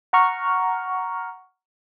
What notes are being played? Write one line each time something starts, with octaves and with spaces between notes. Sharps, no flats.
F#5 A#5 C#6 F6